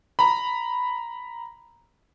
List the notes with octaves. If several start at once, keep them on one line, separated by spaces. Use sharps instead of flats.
A#5 B5